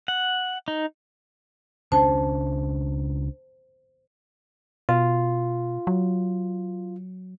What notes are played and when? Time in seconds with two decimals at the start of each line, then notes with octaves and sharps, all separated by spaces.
0.08 F#5
0.68 D#4
1.92 C#2 C#4 D4 C5 A5
4.89 B2 F4
5.87 F#3